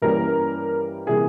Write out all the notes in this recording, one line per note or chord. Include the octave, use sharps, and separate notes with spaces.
G2 E3 G3 A#3 C#4 A#4
C3 E3 G3 A#3 G#4